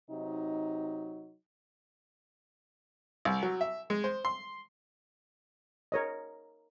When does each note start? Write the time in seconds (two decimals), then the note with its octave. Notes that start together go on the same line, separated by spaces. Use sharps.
0.10 C3 F#3 D#4
3.25 C2
3.43 F#3
3.61 E5
3.90 G#3
4.04 C5
4.25 C6
5.92 A#4 C#5 D#5